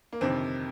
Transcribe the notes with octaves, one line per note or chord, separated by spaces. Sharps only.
A#3
G1 F2 C3 D#3 C4